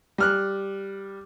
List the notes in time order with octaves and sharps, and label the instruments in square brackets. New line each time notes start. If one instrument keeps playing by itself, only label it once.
[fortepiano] G3 F6 F#6